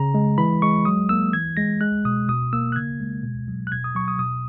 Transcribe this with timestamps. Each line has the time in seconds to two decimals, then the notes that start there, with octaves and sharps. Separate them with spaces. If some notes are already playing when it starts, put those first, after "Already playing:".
Already playing: C#3 A#5
0.14 G#3
0.38 E3 B5
0.62 G#3 C#6
0.85 F#3 D#6
1.09 A#3 E6
1.33 E3 G#6
1.57 G#3 A#6
1.81 G#3 F#6
2.05 B2 D#6
2.29 B2 D#6
2.53 A#3 E6
2.72 F#6
2.76 C#3 G#6
3.00 G#3
3.23 B2
3.48 F#3
3.67 F#6
3.72 B2 G#6
3.84 D#6
3.95 F#3 C#6
4.08 D#6
4.19 B2 D#6